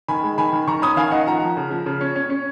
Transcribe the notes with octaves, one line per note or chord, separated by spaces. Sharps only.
D#3 G#5 B5
G#3
D#3 G#5 B5
D#3
D#3 A#5 C#6
C#4 B5 D#6
D#3 F5 G#5
D#3 D#5 F#5
F3 F#5 A#5
F3
C#3
F3
C#3
C#4
C#4
C#4